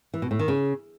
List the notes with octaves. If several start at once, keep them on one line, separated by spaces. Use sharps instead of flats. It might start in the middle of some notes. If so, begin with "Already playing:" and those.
E3
B2
A2
D#3
C#3